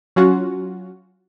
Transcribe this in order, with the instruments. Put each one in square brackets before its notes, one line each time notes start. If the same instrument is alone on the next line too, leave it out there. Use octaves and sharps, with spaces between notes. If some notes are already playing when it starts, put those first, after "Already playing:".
[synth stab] F#3 C#4 F4 F#4